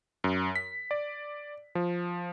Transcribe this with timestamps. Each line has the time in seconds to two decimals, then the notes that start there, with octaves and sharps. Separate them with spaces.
0.24 F#2
0.56 B6
0.91 D5
1.75 F3